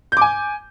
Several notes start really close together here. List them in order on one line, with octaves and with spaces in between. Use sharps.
G6 D6 G#5